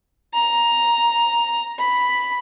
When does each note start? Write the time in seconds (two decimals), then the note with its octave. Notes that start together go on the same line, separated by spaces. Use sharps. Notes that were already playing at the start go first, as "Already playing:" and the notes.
0.34 A#5
1.79 B5